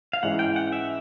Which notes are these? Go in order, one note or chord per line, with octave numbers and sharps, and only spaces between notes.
F5
G#2 E3 G#3 C#4 E4 F#5
G5
F#5
E5